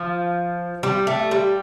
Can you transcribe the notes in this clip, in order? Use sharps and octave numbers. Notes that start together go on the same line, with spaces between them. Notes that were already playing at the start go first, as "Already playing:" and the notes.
Already playing: F3
G3
A3
G3